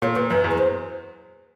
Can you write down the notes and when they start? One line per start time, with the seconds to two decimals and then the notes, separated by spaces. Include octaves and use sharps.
0.02 A#2 C#5
0.16 A#2 B4
0.30 F#2 B4
0.44 E2
0.51 B4
0.58 C5